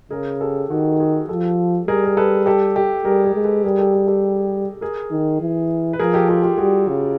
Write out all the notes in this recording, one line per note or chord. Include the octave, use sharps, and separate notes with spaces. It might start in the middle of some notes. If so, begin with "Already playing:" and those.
C#3 G#4 A#4
G4 A4
D#3 F#4 G#4
F#4 G#4
F3 G4 A4
G3 G#4 A#4
A#4
A4 B4
G4 A4
G4 A4
G3 G#4 A#4
G#4 A#4
G#3
A4 B4
G3 G#4 A#4
G4 A4
G4 A4
G4 A4
G#4 A#4
D#3
E3
B4
F3 G#4 A#4
G4 A4
F4 G4
F4 G4
G3 F#4 G#4
C#3